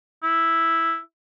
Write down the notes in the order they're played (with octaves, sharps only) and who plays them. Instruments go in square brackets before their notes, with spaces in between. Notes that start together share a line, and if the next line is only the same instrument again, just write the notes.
[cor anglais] E4